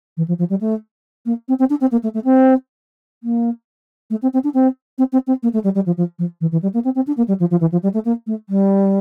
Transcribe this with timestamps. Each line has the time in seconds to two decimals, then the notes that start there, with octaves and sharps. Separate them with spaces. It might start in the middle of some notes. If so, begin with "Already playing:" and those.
0.17 E3
0.28 F3
0.39 F3
0.50 G3
0.61 A3
1.26 A#3
1.48 C4
1.59 C4
1.70 D4
1.81 C4
1.92 A#3
2.03 A3
2.14 A3
2.24 C4
3.23 A#3
4.10 A3
4.22 C4
4.33 C4
4.44 D4
4.54 C4
4.98 C4
5.13 C4
5.27 C4
5.43 A#3
5.53 A3
5.64 G3
5.75 G3
5.86 F3
5.97 F3
6.19 F3
6.41 E3
6.52 E3
6.62 G3
6.74 A#3
6.85 C4
6.95 C4
7.07 D4
7.17 A#3
7.28 G3
7.40 F3
7.51 F3
7.61 E3
7.72 F3
7.83 G3
7.94 A3
8.05 A#3
8.27 A3
8.49 G3